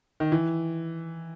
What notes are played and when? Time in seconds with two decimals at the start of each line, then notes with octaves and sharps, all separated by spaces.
0.20 D#3
0.32 E3